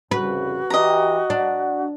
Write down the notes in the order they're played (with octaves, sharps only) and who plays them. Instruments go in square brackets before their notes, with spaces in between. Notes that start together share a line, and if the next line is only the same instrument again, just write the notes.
[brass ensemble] C2 F2 C#3 [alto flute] F#4 [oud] B4
[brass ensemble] E3 G4 [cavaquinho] D#5 A#5
[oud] D4 [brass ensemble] F#5